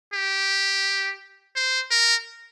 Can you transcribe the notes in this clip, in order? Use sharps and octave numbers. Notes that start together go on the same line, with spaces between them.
G4
C5
A#4